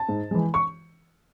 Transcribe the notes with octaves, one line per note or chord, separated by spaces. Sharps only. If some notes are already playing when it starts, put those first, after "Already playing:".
Already playing: A5
G#2
E3 G#3
C#6